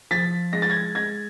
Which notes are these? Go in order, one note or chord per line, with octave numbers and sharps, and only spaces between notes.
F3 A6 B6
G#3 A#6
A6
G#6 A#6
G#3 G#6 A#6